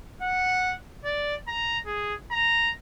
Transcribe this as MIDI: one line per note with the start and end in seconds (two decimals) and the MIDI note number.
0.22 0.74 78
1.05 1.35 74
1.48 1.78 82
1.86 2.14 68
2.31 2.72 82